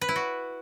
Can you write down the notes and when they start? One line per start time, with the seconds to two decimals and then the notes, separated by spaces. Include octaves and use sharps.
0.01 B4
0.09 E4
0.16 F#4